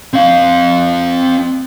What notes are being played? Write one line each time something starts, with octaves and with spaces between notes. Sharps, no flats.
C4 F5